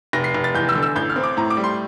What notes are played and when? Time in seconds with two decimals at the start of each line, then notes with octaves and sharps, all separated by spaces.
0.13 F1 A#6
0.24 C7
0.34 F1
0.44 A6
0.55 E2 G6
0.69 E6
0.75 D3
0.83 E6
0.96 A1 G6
1.10 F6
1.16 C4
1.24 D6
1.37 A2 A#5
1.50 D6
1.57 G3
1.64 C6